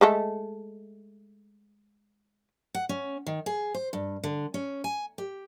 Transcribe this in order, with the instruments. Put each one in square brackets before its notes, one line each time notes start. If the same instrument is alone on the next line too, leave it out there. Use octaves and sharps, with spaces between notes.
[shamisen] G#3 A3 A4
[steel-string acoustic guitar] F#5
C#4
D#3
G#4
C5
G2
D3
C#4
G#5
G4